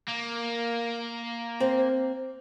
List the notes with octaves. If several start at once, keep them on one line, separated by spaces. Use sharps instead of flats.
A#3
C4